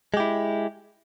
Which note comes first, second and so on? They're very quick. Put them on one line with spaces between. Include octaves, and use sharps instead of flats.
G#3 G4 E4